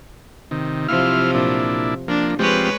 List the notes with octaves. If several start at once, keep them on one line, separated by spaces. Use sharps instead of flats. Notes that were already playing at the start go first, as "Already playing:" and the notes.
C3 D#3
C3 F3 F#3 E4 F5 F6
A#2 D4 E4
F3 A#3 D4
F3 G#3 C4 G4 B4 C#5